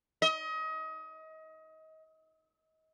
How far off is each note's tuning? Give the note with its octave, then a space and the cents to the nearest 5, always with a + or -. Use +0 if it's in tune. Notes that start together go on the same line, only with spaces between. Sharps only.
D#5 +30